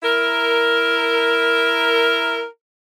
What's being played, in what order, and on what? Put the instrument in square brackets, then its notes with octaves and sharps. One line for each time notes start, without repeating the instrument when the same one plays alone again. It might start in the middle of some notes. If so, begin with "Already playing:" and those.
[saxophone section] E4 A#4